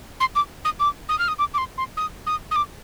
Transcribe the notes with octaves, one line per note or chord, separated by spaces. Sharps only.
C6
D6
D#6
D6
D#6
F6
D#6
D6
D6
C6
C6
D#6
D#6
D#6
D6